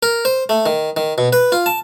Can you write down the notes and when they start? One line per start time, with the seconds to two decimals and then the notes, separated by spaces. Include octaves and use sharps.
0.03 A#4
0.25 C5
0.49 A3
0.66 D#3
0.97 D#3
1.18 B2
1.33 B4
1.52 F4
1.66 A5